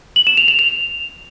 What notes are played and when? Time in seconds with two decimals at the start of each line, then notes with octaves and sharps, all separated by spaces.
0.16 F#7
0.27 E7
0.37 F7
0.48 F7
0.59 F7